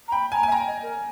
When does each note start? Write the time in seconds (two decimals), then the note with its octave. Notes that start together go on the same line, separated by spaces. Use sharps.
0.08 A#5
0.12 G5 B5
0.32 G#5 A#5
0.43 E5 G#5
0.52 G5 A#5
0.67 D#5
0.82 A#4